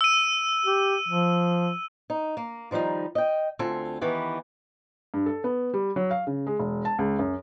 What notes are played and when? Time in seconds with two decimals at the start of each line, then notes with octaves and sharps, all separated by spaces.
0.01 E6 D#7
0.66 G4
1.08 F3
2.10 D#4
2.37 A#3
2.71 D#3 F3 G3 C4 D#4
3.15 D#5 G5
3.59 D2 C4 F4 A4 G#5
4.01 D#3 E3 B3 G4
5.14 G2
5.26 A4
5.44 B3
5.74 G3
5.96 F#3
6.11 F5
6.27 C#3
6.47 G#3
6.59 E1
6.85 A5
6.99 C#2
7.19 F#2